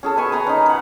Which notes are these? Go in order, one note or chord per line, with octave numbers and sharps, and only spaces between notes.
C#4 G#4 A4
B4 G#5 C#6
B4 A#5 C6
C#4 D#4
B4 F#5